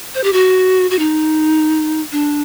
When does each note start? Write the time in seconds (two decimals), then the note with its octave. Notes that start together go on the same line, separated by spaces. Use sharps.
0.15 C5
0.24 G4
0.33 F#4
0.91 F#4
0.99 D#4
2.12 D4